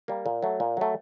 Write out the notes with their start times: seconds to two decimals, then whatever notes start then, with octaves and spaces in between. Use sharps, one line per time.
0.08 G3 A#3
0.26 A#2
0.43 F#3 A3
0.60 A#2
0.77 F#3 A3